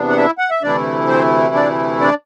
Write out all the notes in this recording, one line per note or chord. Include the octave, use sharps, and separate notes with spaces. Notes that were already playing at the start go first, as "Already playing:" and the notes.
Already playing: E2 C3 E3 B3 D4
F#5
E4 E5
F#5
E5
D2 C3 E3 A3 D4 E4 D5
C4 C5
D4 D5
D4 D5